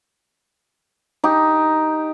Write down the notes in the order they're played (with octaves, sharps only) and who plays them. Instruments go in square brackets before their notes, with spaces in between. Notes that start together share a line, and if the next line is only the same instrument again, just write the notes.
[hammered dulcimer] D#4 G4